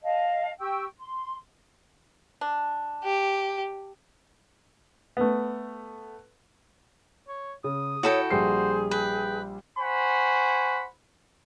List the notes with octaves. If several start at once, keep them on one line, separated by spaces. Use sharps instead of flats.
D#5 F5 A5
G4 G5 C#6 E6
C6
D4
G4
A3 B3
C#5
C#3 D#6
E4 F#4 A4 C#5 G5 B5
A#1 G3 G#4 C5 C7
B4 G5
C5 F#5 G#5 B5 C#6